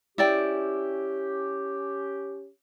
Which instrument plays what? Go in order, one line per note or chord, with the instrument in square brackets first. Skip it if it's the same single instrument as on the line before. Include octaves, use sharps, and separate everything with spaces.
[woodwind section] C#4 G4 [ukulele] E4 D5 G5